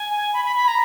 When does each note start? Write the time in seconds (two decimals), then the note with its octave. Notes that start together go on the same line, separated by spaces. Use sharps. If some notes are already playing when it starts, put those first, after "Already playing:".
Already playing: G#5
0.33 B5
0.45 B5
0.56 B5
0.68 A#5